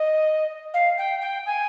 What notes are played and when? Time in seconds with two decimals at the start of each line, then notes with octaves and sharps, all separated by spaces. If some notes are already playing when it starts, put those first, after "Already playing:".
Already playing: D#5
0.73 F5
0.97 G5
1.21 G5
1.46 G#5